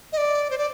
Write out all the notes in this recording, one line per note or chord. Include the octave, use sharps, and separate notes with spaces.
D#5
D5
C5
D5